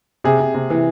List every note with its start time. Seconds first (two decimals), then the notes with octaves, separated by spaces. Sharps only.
0.24 C3 G#4
0.40 C3
0.54 C3
0.70 E3